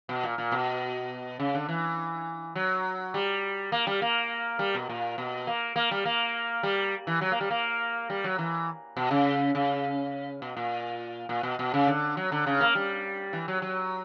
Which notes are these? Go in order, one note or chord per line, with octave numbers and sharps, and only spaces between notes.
B2
A#2
A#2
B2
C#3
D3
E3
F#3
G3
A#3
G3
A#3
G3
B2
A#2
B2
A#3
A#3
G3
A#3
G3
E3
F#3
A#3
G3
A#3
G3
F#3
E3
B2
C#3
C#3
B2
A#2
A#2
B2
B2
C#3
D3
F#3
D3
C#3
A#3
G3
E3
F#3
F#3